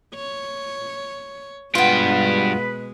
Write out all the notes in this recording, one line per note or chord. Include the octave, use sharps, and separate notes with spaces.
C#5
G2 B2 G#3 B3 F4 B4 G5